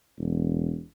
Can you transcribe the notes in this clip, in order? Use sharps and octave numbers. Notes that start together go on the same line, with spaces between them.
E1